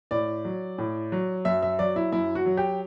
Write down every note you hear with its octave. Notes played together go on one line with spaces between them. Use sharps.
A2 D5
F#3
A2
F#3
F#2 E5
E5
F#3 D5
E4
F#2 E4
F#4
F#3
G4